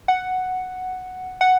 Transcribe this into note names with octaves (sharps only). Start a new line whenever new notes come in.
F#5
F#5